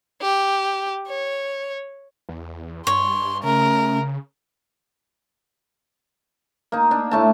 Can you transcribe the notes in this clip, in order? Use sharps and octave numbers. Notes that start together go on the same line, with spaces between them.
G4
C#5
E2
G2 C#5 C6
C#3 A3 C#4 A#4
A#3 D#4
D4
A2 A3 A5